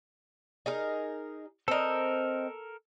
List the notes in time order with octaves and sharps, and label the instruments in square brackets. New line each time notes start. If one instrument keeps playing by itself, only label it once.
[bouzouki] D#4 G#4 A#4
[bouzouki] C4 D#5 [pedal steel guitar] A4 A#4